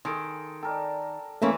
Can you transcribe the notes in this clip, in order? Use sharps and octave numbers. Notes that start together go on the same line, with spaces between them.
D#3 G#4 A4 C6 A#6 D7
A4 A#4 D5 G5 A5
E3 A3 A#3 C#4 E4 B4 C6 C#6